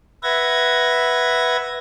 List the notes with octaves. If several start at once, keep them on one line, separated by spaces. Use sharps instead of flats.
B4 E5 F#5 G#6 A#6